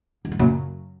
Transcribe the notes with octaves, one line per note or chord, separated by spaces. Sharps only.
F#2
G#2
F#2 A#2 C#3 F#3